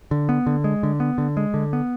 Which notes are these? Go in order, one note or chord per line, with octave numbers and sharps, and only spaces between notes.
D3
B3
D3
G#3
D3
B3
D3
G#3
D3
B3